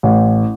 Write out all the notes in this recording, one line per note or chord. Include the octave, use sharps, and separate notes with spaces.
A1